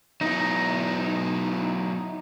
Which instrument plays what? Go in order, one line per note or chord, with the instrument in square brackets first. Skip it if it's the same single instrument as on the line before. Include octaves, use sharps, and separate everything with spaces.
[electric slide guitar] F#3 B3 E4 [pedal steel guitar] D#4